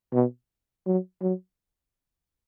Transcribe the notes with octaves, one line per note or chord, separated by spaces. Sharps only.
B2
F#3
F#3